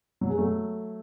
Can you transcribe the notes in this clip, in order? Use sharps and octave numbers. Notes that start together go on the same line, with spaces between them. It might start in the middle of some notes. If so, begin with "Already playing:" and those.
F#3
G#3
F#3 A3